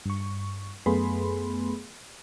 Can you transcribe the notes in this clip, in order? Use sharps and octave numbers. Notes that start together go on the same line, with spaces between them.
G2 C#6
F#2 A3 B3 G#4 B5 C6